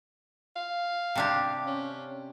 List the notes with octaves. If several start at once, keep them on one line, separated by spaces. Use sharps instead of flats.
F5
C3 D4 G4
C#4